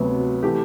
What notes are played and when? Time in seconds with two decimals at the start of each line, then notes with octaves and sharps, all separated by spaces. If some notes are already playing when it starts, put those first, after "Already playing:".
Already playing: D2 C3 F#3 B3
0.43 E3 A3 G4